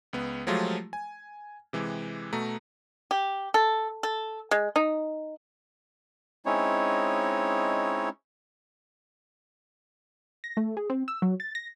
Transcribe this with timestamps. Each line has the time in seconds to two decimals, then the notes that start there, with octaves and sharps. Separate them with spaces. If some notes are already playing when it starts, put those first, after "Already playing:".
0.13 C#2 B3
0.47 F3 F#3 G#3 A3 F4 G4
0.93 G#5
1.73 C3 E3 G#3 G4
2.33 B2 A3 A#5
3.11 G4
3.54 A4
4.03 A4
4.51 G#3
4.76 D#4
6.46 G#3 C4 C#4 D#4 E4 C#5
10.44 A#6
10.57 A3
10.77 G#4
10.90 C4
11.08 E6
11.22 F#3
11.40 A6
11.55 A#6